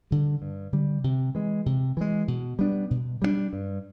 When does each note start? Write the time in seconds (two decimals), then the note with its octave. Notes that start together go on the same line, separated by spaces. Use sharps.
0.11 D3 G3
0.42 G2
0.73 D3 G3
1.04 C3
1.35 E3 G#3
1.66 C3
1.97 E3 G#3
2.28 B2
2.59 G3 B3 D4
2.91 B2
3.22 G3 B3 D4
3.53 G2